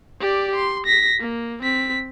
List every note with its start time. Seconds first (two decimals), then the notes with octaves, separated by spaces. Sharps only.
0.20 G4 D5
0.55 C6
0.86 A#6 B6
1.20 A#3
1.62 C4 B6